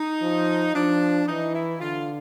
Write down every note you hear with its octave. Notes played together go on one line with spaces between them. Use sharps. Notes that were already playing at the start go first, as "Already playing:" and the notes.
Already playing: D#4
F3
F3 D4
E3 D#4
E4
D3 F4